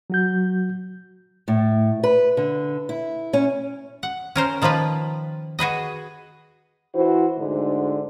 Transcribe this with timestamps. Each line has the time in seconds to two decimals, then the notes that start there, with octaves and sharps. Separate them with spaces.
0.10 F#3 F#4 G6
1.48 A2
2.04 B4
2.37 D3
2.89 E4
3.33 C#4
4.03 F#5
4.36 C#4 A#4 C5
4.62 D#3 F3 A#3 F4 B4
5.59 F#4 G#4 B4 D#5
6.93 E3 E4 F#4 C5
7.37 D2 G#2 D3